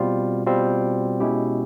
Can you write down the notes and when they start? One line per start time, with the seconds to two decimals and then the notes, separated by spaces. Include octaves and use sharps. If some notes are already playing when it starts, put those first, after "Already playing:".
Already playing: B2 G3 C4 F4
0.46 B2 G3 C4 F4
1.20 B2 G#3 C#4 E4 G4